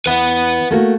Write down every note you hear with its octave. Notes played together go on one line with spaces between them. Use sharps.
E2 B4 F#5
A3 A#3 F#4